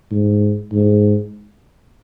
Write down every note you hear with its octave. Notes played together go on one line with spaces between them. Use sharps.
G#2
G#2